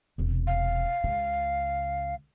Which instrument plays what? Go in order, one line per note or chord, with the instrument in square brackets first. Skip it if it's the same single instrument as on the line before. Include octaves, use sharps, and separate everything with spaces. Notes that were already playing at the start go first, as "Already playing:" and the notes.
[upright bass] E1 C3
[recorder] F5
[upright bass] C#2 C#3